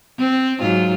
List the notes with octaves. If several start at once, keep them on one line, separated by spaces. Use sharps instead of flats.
C4
G#2 F#3 F4